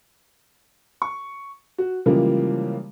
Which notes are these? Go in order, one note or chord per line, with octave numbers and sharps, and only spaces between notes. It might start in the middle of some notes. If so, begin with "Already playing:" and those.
C#6
F#4
C#3 E3 F3 G3 G#3 A#3